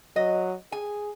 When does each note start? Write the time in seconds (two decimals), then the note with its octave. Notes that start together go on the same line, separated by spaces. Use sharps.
0.16 F#3 B4 D#5
0.72 G#4 G#5